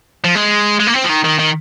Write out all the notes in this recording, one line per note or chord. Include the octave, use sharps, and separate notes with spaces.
F3
G#3
G#3
A#3
C4
F3
D#3
D#3
D#3